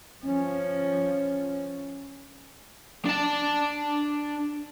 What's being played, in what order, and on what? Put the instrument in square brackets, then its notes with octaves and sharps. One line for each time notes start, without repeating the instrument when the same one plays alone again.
[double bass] F3 C#4
[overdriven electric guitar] D4 A5